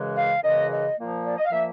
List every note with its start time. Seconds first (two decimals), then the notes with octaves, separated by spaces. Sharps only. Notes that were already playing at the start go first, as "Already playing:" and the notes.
Already playing: F#2 C#3 E3 G#3
0.16 F5
0.43 F#2 C#3 E3 G#3 D#5
0.71 D#5
0.98 A#2 F3 A#3
1.24 D5
1.38 D#5
1.45 F5
1.52 A#2 F3 A#3 E5